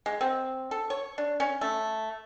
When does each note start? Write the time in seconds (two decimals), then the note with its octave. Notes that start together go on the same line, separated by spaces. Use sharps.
0.06 G#3
0.21 C4
0.71 A4
0.90 C#5
1.18 D4
1.40 C#4
1.61 A3